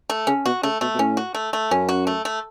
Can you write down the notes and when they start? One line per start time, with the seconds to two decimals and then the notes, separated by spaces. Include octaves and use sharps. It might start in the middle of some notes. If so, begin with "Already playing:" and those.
0.10 A3
0.27 C#3 C#4
0.46 B2 F#4
0.63 C#3 A3
0.81 B2 A3
0.95 B2
0.99 A2 C#4
1.17 F#4
1.34 A3
1.53 A3
1.71 F#2 C#4
1.89 F#4
2.07 A3
2.25 A3